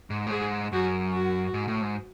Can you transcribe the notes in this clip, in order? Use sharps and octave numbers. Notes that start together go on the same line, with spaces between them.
G#2
A2
G#2 G#4
F#2 F#4
F#4
G#2
A2
G#2